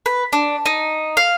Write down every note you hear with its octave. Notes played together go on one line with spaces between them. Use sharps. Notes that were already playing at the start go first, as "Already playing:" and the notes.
B4
D4
D#4
F5